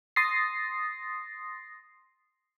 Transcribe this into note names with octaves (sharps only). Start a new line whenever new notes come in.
C6 D#6 A6 A#6 C7